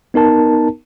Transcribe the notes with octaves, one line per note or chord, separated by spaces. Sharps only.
B3 D#4 A#4 A5